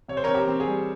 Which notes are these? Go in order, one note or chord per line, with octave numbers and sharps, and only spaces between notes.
C3 C#5
C5
C4 A#4 C#5
G4 A#4
C4
G#4
G3